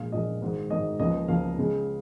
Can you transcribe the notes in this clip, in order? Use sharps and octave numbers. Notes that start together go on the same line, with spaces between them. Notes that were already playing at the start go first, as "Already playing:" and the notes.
Already playing: A#1 A#2 G#3 F5
A#1 A#2 G#3 D#5
G#1 G#2 D#3
G#1 G#2 D#3 D#5
C#2 C#3 F3 A#3 D#5
C#2 C#3 F3 A#3 F5
C#2 C#3 G#3